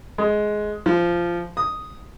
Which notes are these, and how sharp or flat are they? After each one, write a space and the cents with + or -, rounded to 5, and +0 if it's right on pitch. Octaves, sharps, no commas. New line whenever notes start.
G#3 +15
F3 -15
D#6 +0